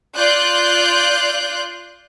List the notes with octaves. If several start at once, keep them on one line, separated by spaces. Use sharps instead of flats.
F4 D5 C6 F#6 G6